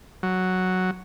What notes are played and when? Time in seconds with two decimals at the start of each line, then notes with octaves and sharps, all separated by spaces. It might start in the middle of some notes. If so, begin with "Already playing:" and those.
0.23 F#3